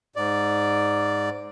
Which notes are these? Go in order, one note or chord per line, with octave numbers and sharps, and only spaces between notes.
G#2 D5